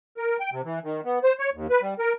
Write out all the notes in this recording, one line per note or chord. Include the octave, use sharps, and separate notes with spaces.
A#4
G5
C3
E3
D#3
B3
C5
C#5
D#2
B4
G3
A#4